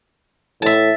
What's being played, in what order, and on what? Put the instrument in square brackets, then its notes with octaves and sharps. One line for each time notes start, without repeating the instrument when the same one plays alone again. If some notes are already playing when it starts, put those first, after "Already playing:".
[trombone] A2 [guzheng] E5 A5